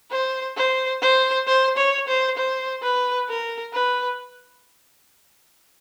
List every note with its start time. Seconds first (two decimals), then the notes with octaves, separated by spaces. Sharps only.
0.11 C5
0.57 C5
1.02 C5
1.47 C5
1.77 C#5
2.08 C5
2.37 C5
2.83 B4
3.28 A#4
3.73 B4